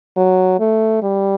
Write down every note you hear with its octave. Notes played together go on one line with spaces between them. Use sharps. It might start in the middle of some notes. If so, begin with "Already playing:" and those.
F#3
A3
G3